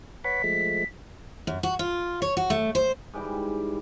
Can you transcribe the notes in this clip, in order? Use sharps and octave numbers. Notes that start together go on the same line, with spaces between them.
B4 C#5 F#5 B6
F3 G#3 A3
F#2
F#4
F4
C#5
F#4
A3
C5
G#2 E3 G3 G5